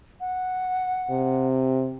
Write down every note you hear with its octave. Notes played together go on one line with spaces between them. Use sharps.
F#5
C3